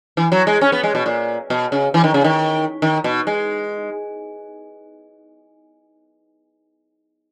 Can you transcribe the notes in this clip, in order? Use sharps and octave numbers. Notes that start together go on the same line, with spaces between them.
E3
F#3
G#3
C#4
B3
G#3
B2
A#2
B2
C#3
E3
D#3
C#3
D#3
D#3
B2
G#3